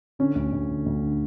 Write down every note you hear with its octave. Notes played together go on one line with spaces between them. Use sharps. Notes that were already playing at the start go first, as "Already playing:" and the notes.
D3 C#4
D2
D2
D3
D2
D3